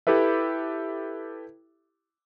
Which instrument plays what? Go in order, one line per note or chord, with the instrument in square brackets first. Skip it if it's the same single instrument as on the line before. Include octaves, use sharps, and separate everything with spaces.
[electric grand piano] E4 G4 A4 B4 E5